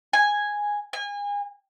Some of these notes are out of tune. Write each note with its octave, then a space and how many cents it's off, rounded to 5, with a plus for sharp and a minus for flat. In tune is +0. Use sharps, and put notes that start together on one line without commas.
G#5 -5
G#5 -30